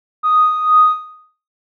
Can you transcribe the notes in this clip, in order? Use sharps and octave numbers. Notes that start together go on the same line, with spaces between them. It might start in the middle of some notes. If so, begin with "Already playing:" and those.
D#6